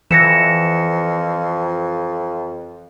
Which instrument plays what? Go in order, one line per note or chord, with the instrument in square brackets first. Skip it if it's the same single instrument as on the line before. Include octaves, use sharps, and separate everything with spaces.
[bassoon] F2 [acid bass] E3 [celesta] A#6 C#7 E7